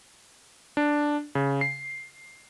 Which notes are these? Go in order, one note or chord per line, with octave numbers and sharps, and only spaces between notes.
D4
C#3
C7